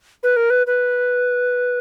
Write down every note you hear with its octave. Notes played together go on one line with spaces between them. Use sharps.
B4
A#4
B4
B4